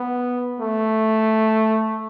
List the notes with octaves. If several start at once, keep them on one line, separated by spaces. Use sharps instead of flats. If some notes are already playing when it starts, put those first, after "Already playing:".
Already playing: B3
A3